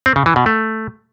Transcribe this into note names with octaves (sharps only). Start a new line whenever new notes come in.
C4
C#3
E3
B2
A3